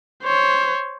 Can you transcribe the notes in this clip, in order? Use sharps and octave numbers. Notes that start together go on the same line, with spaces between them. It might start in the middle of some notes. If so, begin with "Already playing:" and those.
C5 C#5